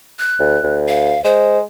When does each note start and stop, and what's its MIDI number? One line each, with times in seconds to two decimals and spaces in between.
0.19 0.75 90
0.39 0.58 38
0.64 1.15 38
0.88 1.23 77
1.24 1.62 56
1.24 1.58 72